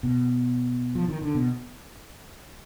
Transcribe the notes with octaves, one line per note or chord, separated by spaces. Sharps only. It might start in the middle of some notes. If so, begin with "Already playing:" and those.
B2
F3
D#3
D3
B2